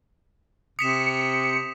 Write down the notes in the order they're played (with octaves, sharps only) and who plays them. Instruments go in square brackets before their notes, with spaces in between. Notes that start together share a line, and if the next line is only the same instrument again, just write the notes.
[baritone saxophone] C3 [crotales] D#6 B6 E7 [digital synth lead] C#7